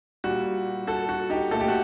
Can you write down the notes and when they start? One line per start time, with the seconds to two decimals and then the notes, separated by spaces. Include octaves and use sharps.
0.24 A#2 G3 F#4
0.87 F#4 A4
1.09 F#4
1.30 D#4 G4
1.51 A#2 A3 A4
1.61 G4
1.68 F#4